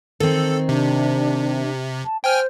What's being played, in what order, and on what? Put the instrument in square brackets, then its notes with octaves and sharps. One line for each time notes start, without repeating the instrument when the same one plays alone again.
[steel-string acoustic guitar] D#3 C4 [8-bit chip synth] A4
[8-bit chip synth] C3 [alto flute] D4
[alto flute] A5
[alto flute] C5 [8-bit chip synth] G5 G#5 F6